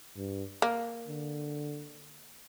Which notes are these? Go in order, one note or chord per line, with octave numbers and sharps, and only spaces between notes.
G2
A#3
D3